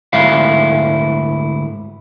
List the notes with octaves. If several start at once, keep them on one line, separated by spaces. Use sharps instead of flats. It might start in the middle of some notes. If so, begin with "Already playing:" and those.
D2 G#2 E4 F5